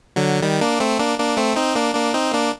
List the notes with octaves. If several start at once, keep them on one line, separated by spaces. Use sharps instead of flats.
D3 F#3
D#3 G3
A#3 D4
A3 C4
A#3 D4
A#3 D4
A3 C4
C4 D#4
A#3 D4
A#3 D4
C4 D#4
A#3 D4